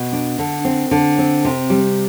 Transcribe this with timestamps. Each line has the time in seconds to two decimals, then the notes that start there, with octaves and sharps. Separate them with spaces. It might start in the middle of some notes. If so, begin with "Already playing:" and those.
Already playing: B2
0.13 D4
0.39 D3
0.65 C4
0.91 D3
1.18 C4
1.45 C3
1.70 G3